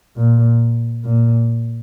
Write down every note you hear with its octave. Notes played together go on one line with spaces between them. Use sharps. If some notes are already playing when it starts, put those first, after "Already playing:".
A#2
A#2